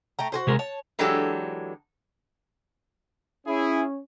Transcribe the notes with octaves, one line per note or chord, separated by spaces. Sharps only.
A3 G5 A#5
F#4 G#4 C5
C3 G#3 A#4
C#5 A5
E3 F#3 G#3 D4 G4 A4
C#4 E4 G#4